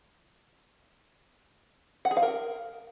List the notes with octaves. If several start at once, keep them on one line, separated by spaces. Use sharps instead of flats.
F#5
G#4
F5
A#4